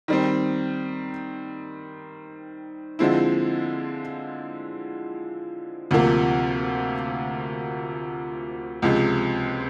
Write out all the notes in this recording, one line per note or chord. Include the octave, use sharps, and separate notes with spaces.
D#3 G3 C4
D3 F3 G#3 C4 E4
D2 C3 F3 A#3
C#2 C3 F3 G#3